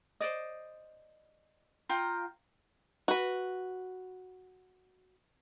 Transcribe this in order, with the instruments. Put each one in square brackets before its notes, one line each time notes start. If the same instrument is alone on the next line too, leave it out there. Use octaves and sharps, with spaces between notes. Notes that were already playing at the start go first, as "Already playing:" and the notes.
[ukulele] C5 D5 D#5
[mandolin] F4 G5 A#5
[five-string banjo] F#4 B4